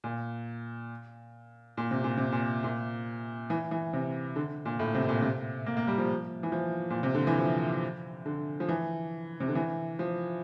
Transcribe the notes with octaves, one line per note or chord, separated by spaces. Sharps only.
A#2
A#2
C3
A#2
C3
A#2
A#2
E3
E3
C3
D3
A#2
A2
C3
A2
A#2
C3
A#3
A#3
G3
F3
E3
F3
A#2
C3
D3
E3
F3
D3
F3
E3
C3
D3
E3
F3